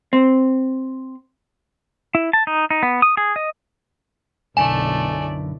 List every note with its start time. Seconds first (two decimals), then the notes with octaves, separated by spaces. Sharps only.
0.13 C4
2.15 E4
2.33 A5
2.47 D#4
2.70 D#4
2.83 B3
3.02 D#6
3.17 G#4
3.36 D#5
4.57 B1 F#2 D3 A3 E4 D5 G#5